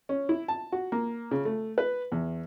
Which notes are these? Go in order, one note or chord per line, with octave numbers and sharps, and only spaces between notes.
C#4
E4
A5
F#4
A#3
C#3
A3
B4
E2